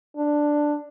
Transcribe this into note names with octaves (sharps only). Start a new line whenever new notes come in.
D4